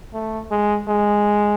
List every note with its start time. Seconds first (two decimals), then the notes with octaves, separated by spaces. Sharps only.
0.14 A3
0.51 G#3
0.88 G#3